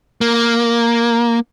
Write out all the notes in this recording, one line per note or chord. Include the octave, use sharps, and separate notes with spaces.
A#3